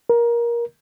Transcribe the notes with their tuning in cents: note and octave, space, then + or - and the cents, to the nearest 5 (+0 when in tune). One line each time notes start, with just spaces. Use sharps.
A#4 +20